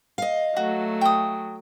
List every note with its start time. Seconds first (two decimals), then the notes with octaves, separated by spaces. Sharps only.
0.18 D#5 F5
0.57 F#3 A3 F#4
1.01 G5 D#6